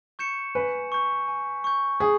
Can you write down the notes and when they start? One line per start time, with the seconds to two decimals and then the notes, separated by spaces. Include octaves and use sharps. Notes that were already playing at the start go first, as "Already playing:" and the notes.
0.19 C#6 G6 C#7 E7
0.55 B4 G#5
0.92 C#6 G6
1.28 G#5
1.64 C#6 G6
2.00 G#4 D#6